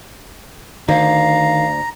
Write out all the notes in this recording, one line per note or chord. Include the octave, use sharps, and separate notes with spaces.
D2 D#3 F5 A#5